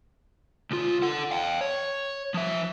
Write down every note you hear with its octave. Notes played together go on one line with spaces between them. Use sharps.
C#2 F4
A4 F#5
F5 G5
C#5
F3 E5